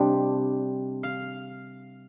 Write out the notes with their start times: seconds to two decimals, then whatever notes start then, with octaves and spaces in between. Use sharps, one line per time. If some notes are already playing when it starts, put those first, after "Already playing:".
Already playing: C3 G3 D4 D#5
1.03 F5